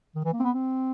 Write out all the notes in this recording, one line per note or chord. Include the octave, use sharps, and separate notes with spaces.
D#3
E3
A#3
C4
B3
C4